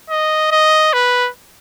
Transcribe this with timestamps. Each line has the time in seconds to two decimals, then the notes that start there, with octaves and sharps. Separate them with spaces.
0.10 D#5
0.51 D#5
0.93 B4